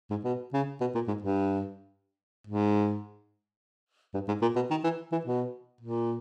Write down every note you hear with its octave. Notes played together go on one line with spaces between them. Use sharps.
G#2
B2
C#3
B2
A#2
G#2
G2
G#2
G2
G#2
A#2
B2
D#3
E3
E3
B2
A#2